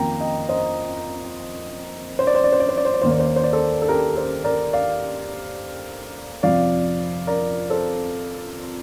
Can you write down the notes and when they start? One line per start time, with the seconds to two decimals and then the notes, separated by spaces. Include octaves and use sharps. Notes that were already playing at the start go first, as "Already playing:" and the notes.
Already playing: F2 D#3 A#3 G5 A#5
0.20 D#5 G5
0.49 C5 D#5
2.19 C5
2.27 D5
2.35 C5
2.44 D5
2.53 C5
2.60 D5
2.69 C5
2.77 D5
2.85 C5
2.94 D5
3.02 D#2 D#3 A#3 C5
3.11 D5
3.19 C5
3.27 D5
3.36 C5
3.44 D5
3.53 A4 C5
3.82 A4
3.88 G4 A#4
4.16 A4 C5
4.44 A#4 D5
4.73 D5 F5
6.43 F2 C3 F3 D5 F5
7.27 A#4 D5
7.70 A4 C5